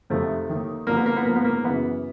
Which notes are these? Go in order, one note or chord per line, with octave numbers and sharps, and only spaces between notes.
F2 C3 D#3 A3
D#2 D#3
G2 D3 F3 A#3
B3
A#3
B3
G#2 F3 A#3
B3
A#3
F#2 C#3 E3 B3